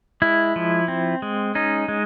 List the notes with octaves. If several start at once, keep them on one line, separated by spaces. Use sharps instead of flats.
G#3 E4
F3
C4
G#3
C#4 D#4
G#3